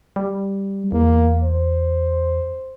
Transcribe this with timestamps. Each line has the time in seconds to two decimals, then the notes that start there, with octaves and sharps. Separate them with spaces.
0.16 G3
0.92 E2 A#3
1.44 C5